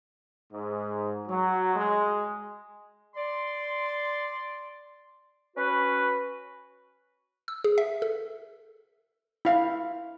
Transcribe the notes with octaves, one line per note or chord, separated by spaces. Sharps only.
G#2
F#3
G#3
D5 C6
C#4 F#4 B4
E6
G#4
E5
A4
E4 F5